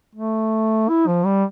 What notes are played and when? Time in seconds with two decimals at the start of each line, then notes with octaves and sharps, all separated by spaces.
0.16 A3
0.89 E4
1.07 F3
1.25 G3